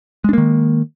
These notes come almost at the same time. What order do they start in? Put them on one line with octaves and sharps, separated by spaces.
G#3 D4 A#3 D#3